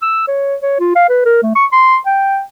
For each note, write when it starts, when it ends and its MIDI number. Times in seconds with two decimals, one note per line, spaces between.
0.02 0.26 88
0.28 0.56 73
0.62 0.77 73
0.80 0.91 65
0.95 1.06 77
1.09 1.25 71
1.26 1.41 70
1.43 1.51 57
1.55 1.65 85
1.72 1.97 84
2.06 2.41 79